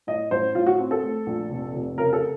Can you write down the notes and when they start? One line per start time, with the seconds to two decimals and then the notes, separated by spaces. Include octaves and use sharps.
0.07 A2 D#5
0.31 A1 C5
0.55 A2 F4
0.66 F#4
0.79 C4
0.91 A4
1.03 A3
1.26 A#1
1.50 F1
1.74 F1
1.98 C#3 A#4
2.13 A4